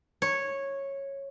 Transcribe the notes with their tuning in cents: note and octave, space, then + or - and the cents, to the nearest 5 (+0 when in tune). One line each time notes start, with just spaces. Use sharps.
C#5 -10